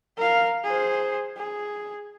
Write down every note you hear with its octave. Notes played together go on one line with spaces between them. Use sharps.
A#4 F5
G#4 C5
G#4